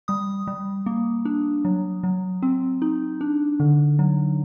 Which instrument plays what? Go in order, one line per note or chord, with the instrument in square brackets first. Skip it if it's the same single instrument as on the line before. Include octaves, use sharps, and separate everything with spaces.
[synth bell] G3 D#6
G3
A#3
D4
F#3
F#3
C4
D#4
D4
D3
F#3